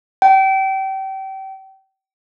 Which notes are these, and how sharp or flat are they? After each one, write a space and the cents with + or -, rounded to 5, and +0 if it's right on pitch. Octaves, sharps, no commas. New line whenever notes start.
G5 -30